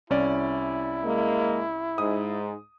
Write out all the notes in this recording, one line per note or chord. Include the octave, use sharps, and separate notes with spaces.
C2 C#4 E4 D5
G#3 A#3
G#2 D#6